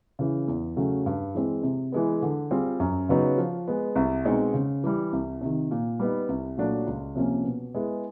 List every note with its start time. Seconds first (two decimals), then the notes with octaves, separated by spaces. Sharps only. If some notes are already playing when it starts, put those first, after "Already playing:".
0.19 C#3 E3
0.48 E2
0.76 C#3 F#3 A3 C#4
1.06 G2
1.35 E3 G#3 C4
1.63 C3
1.92 E3 G#3 B3
2.22 D3
2.51 G3 C4 F4 G#4
2.80 F#2
3.09 C#3 F#3 B3 D#4
3.38 F3
3.68 G#3 B3
3.96 C2
4.25 B2 G#3 C4 D#4
4.54 C#3
4.84 E3 G3
5.13 C2
5.41 C3 D#3
5.71 A#2
5.99 G3 B3 D#4
6.29 C2
6.57 A#2 F#3 A3 D4
6.87 C#2
7.16 C3 F3 A#3 C#4
7.44 B2
7.74 G#3 B3 E4 G#4